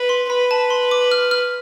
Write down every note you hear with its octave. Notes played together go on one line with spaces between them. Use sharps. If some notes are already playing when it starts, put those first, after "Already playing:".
Already playing: B4
C6
B4 B5
A5
C6
D6
F6
F6